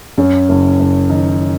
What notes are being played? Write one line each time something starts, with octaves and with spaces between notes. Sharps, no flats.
F#2 C#4
F#1
F#1
D#3 D#4